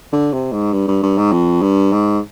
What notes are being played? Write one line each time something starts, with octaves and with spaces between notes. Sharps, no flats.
D3
C3
G#2
G2
G2
G2
G#2
F2
G2
G#2